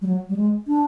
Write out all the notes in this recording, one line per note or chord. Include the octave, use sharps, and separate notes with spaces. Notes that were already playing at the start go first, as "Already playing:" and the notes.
G3
F#3
G3
G#3
D4